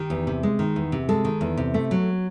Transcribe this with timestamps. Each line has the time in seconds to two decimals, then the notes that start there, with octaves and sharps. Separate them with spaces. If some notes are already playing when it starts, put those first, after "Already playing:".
Already playing: D#3 G4
0.10 E2
0.27 C3
0.43 G#3
0.59 D#3
0.76 E2
0.92 C3
1.09 G#3 A4
1.24 D#3
1.41 E2
1.57 C3
1.74 A3
1.91 F#3